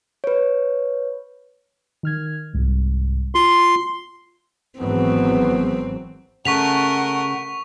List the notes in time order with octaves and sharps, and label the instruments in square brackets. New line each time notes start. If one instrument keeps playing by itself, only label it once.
[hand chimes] B4 C#5
[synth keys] D#3 F6 G#6
C2 G#2
[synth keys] F4 [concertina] C6
[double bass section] G#1 E3 F#3 [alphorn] B3 [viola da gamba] C4
[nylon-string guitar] C#3 [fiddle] A3 A#4 [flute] F#5 [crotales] C#6 B6 F7